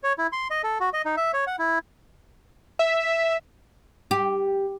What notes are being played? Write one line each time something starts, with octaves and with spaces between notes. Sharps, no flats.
C#5
E4
C6
D#5
A4
F#4
D#5
D#4
E5
C#5
F#5
E4
E5
G4